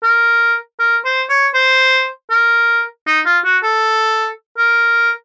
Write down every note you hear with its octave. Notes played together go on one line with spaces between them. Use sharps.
A#4
A#4
C5
C#5
C5
A#4
D#4
F4
F#4
A4
A#4